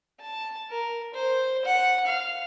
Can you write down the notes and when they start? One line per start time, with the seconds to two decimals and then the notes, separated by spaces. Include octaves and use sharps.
0.21 A5
0.70 A#4
1.14 C5
1.65 F#5
2.07 F5